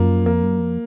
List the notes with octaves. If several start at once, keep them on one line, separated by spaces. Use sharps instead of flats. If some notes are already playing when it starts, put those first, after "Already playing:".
Already playing: F#2 F3 A#3
F2 A#3
F#2
F2